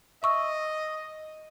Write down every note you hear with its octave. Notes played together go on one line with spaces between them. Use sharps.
D#5 E5 C#6 E6